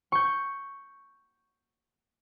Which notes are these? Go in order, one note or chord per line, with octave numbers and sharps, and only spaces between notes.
C#6 G6